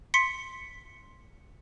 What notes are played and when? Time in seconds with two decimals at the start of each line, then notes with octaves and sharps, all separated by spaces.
0.14 C6 B6 C#7